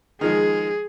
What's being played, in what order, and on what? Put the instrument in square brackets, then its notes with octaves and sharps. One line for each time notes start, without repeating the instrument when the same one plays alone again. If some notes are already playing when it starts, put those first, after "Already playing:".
[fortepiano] D#3 F3 G#3 [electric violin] G#4